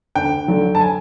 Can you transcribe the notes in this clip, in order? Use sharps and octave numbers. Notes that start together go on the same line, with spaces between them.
D2 G5
D3 F#3
A5
G#5